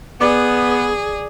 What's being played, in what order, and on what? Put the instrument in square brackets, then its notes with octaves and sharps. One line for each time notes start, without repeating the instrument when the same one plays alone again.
[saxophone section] B3 [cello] G#4 [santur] D5